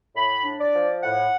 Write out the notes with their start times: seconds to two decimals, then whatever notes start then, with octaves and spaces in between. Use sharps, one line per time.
0.15 A2 B5
0.44 D4
0.59 D5
0.74 F3
1.02 A2 F#5